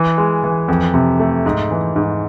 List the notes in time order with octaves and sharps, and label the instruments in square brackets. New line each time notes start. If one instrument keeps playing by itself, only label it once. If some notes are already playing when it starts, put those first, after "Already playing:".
Already playing: [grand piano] E3
G#3
E3
F2
C3
A3
G#2
E3
G#2